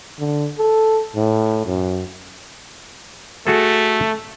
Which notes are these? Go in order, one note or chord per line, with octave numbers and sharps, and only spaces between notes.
D3
A4
A2
F#2
A3 F#4 G#4 A4